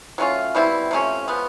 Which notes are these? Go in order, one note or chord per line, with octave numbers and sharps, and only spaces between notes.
F#3 A3 C#4 F4
B2 G3 C4 E4
C3 F3 A3 C#4
F3 G#3 B3